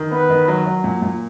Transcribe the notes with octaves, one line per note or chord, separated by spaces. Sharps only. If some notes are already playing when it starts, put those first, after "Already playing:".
Already playing: D#3
B3 B4
D#3
F#3
F#3
A#2
A#2